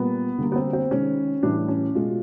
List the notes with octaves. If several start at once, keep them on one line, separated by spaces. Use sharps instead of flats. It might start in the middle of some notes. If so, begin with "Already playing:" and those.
Already playing: A#2 G3 A#3 B3
D3 G3 A#3
B3
C4
C4
D#3 G#3 C#4
A2 E3 G3 D4
C#4
B2 G#3 F4